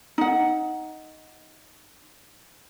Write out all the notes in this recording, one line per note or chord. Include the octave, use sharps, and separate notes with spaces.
D#4 F#5